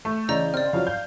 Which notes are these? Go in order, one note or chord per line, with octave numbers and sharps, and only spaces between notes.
A3
C#3 E3 D5 D#5 A#5 G6
C4 D5 F6
C#3 F3 F#3 F5
G6